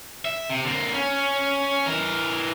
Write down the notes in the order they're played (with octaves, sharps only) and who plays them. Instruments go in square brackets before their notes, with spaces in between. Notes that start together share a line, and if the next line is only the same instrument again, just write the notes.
[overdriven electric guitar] E5
C3
D3 A#3
C#4
E3 A#4